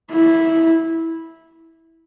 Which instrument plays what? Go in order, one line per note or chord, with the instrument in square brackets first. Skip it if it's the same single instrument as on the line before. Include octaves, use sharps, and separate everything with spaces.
[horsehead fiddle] E4